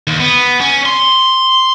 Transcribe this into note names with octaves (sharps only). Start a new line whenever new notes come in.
D#2
B3
C#4
C6